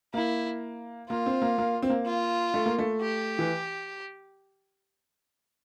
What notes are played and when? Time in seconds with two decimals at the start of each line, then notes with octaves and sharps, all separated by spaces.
0.14 A#3 E4
1.09 A#3 F4
1.26 C4
1.42 A#3
1.58 A#3
1.82 C4
1.90 A#3
2.06 F4
2.54 A3
2.66 A#3
2.79 A3
3.01 G4
3.39 E3